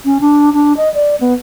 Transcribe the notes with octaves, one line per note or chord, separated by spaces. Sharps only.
C#4
D4
D4
D#5
D5
B3